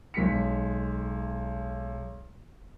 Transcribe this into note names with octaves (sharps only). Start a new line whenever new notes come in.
B1 G#3 B6 C#7